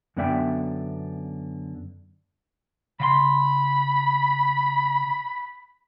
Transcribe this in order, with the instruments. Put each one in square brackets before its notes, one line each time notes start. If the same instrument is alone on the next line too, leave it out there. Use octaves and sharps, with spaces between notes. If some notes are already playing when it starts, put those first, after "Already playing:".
[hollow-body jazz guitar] F#2 D3 B3 D5 E5 G5
[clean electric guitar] C#3 F5 C6 [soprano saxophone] B5